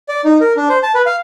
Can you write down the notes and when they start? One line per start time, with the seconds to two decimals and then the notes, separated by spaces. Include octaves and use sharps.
0.09 D5
0.24 D#4
0.41 A#4
0.56 D4
0.69 C5
0.83 A5
0.95 B4
1.06 F5